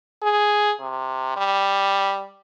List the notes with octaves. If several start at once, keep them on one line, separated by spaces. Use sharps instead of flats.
G#4
C3
G3